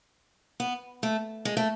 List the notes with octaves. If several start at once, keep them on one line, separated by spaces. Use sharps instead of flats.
B3
A3
G#3
A3